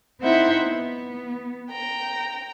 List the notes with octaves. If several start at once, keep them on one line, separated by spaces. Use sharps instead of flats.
C4 D#4 E4 C5 E5 F#5
B3
G5 A#5